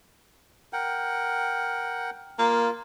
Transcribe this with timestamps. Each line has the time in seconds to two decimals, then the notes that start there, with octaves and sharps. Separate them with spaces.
0.73 A#4 F#5 G5
2.39 A#3 F4